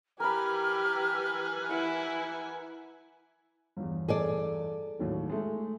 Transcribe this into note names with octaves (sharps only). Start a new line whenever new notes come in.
E3 G4 A#4 B4 G#5 B5 F6
E4 F#5
G1 E2
G#4 A4 D5
D#2 A2 F#3
G#3 A3